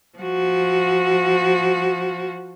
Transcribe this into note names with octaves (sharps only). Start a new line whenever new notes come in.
F3 F#4